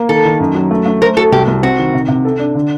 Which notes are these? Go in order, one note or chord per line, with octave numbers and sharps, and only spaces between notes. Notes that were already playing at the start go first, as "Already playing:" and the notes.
Already playing: A#3
D#3 A4
D#3
F#2
F#3
A3
A3
A#4 C5
F#4 A4
C2 G4
C2
C4 F#4
D#3
C3
C3
A4
D4
D3